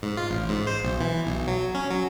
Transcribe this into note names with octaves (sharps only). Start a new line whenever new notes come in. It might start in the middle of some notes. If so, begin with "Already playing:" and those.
G#2
F4
A1
G#2
C5
B1
E3
B1
F#3
C#4
F#3